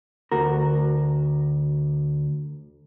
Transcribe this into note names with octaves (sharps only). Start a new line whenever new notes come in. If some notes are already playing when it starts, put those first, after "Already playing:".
D2 F#4 A#4